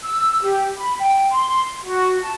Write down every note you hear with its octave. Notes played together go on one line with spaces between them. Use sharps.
E6
G4
B5
G5
C6
F#4
A5